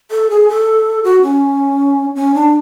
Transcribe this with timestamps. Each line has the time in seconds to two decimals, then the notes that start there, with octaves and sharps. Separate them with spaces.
0.11 A4
0.30 G#4
0.49 A4
1.04 F#4
1.22 C#4
2.16 C#4
2.34 D4